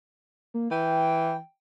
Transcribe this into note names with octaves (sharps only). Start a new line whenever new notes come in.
A#3
E3 G5